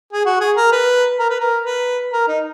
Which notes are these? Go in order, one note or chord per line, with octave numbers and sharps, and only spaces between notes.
G#4
F#4
G#4
A#4
B4
A#4
B4
A#4
B4
A#4
D#4